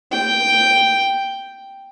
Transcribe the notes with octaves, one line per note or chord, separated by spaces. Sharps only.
G5